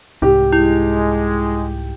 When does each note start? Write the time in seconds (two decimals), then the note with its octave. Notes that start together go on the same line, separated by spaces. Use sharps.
0.22 C2 G#2 G4
0.53 G#3 E4